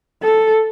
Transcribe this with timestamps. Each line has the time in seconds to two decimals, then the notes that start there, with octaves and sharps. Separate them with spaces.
0.22 A4